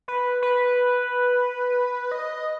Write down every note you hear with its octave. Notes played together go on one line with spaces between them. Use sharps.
B4
B4
D#5